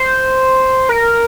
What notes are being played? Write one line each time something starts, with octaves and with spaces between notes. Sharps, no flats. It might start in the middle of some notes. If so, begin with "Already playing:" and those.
Already playing: C5
A#4